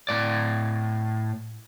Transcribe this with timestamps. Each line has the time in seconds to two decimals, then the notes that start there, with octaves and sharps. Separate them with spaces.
0.09 A2 D5